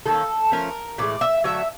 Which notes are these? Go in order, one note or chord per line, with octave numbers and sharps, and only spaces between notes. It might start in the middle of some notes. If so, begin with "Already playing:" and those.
D#3 F#3 A#3 C#4 A4
F3 A3 C#4 A#4
A2 E3 G#3 D5
E5
D3 F#3 A3 E5